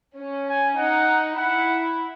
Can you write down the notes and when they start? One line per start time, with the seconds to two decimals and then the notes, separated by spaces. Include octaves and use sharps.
0.18 C#4
0.48 G#5
0.78 D#4 F#5
1.38 E4 F#5